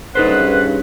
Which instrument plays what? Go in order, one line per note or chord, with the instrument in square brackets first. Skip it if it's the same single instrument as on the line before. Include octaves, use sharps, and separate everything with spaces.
[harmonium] G2 C#3 [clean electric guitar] D#4 A4 C5 [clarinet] B4 [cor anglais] F#5